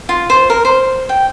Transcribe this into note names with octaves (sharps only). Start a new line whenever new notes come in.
F4
C5
A#4
C5
G5